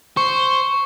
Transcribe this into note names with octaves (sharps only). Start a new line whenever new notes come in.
C5 C#6